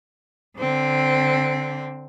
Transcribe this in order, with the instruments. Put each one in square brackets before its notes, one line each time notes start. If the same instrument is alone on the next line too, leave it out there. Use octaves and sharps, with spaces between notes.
[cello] D3 C4